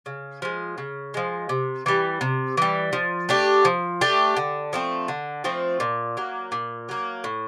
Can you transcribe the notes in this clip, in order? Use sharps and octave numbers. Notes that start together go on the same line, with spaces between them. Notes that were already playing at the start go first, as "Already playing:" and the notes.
C#3
F3 G#3
C#3
F3 G#3
C3
E3 G3
C3
E3 G3
F3
A3 D4 G4
F3
A3 D4 G4
D3
F3 A3 C4
D3
F3 A3 C4
A#2
F#3 A#3
A#2
F#3 A#3
A2